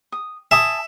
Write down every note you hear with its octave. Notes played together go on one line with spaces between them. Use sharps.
D#6
E5 G#5 A5 D#6